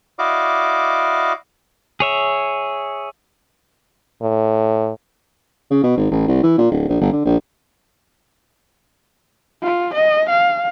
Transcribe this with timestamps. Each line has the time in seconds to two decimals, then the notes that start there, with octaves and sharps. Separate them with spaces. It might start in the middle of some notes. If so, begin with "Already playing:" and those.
0.19 E4 F#4 D5 D#5 F5 D6
2.00 G#4 C#5 E5
4.22 A2
5.71 C#3
5.84 B2
5.97 G#1
6.11 A1
6.28 C2
6.43 E3
6.58 A#2
6.71 D1
6.89 A#1
7.01 G1
7.12 D3
7.25 A#1
9.63 F4
9.94 D#5
10.30 F5